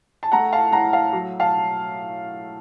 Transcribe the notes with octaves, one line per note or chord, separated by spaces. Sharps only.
A5
A3 F#5 A#5
F5 A5
A2 F#5 A#5
F5 A5
F#3
F5 A5